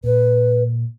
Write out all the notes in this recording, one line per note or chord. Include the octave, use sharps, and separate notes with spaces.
A#2 B4